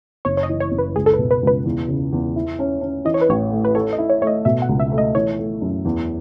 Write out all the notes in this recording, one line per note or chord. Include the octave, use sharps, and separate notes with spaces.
F#1 C#5
C#5
D#5
E3
C#5
F#1
B4
C#2 G#4
A4
B4
B2
B4
C#2 B4
E2
C#3
E2
E4
C#4
C#4
E3 D#5
C#5
B4
A1 C#5
A3
B4
A4 C#5
D#5
E4
C#5
A3 C#5
D#5
B2 E5
F#5
C#2
E5
A3
D#5
E3 C#5
A3
F#2
E2